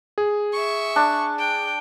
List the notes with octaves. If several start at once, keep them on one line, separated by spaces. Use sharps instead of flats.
G#4
E5 C#6
D4
G5